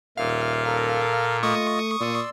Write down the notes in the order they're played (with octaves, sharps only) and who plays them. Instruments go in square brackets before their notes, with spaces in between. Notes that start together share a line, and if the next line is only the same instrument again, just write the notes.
[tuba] D#1 [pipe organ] A#2 [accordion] E5 [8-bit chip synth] F5
[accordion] A4 A#4
[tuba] A3 [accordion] F4 D#5 [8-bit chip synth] C#6 D#6
[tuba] A#2 [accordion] D5 C6 E6